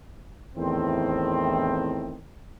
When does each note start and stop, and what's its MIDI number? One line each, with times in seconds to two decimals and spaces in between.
0.56 2.22 40
0.56 2.22 45
0.56 2.22 51
0.56 2.22 60